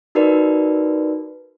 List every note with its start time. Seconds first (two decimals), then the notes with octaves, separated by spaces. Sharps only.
0.15 D#4 F#4 A#4 B4 D5